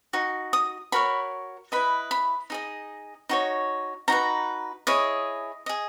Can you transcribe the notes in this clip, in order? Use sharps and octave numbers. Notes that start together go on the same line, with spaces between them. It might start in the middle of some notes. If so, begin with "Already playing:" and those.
D#4 F#4
D#6
F#4 A#4 C#5 B5
E4 B4 D#5 B5
B5
D#4 G#4 D#5
D#4 F#4 C#5
D#4 F#4 B4 A#5
E4 G#4 C#5 D#5
G#4 D#5